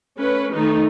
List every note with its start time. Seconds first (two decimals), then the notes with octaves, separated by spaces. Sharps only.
0.17 A3 C#4 B4
0.53 D#3 A3 D#4